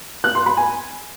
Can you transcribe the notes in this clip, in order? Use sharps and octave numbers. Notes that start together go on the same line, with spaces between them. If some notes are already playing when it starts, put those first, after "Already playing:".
F#6
C6
B5
G#5